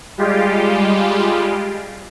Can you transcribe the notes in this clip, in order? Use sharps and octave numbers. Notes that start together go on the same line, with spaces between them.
G3 G#3 F4 G4